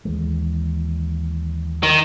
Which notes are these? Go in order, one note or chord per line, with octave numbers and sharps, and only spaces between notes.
D#2 E3 G#3
D#3